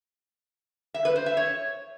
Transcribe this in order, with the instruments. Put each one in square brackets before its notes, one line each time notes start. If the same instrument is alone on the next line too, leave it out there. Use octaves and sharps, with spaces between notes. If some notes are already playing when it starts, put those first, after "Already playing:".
[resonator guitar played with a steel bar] E5
B4
C5
E5
C#5